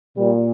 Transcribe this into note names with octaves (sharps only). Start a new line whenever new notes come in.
A#2 G3